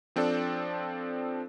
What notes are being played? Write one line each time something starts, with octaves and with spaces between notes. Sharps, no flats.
F3 C4 D4 A4 D5